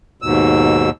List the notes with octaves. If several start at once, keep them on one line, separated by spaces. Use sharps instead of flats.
D#2 G#2 B2 E6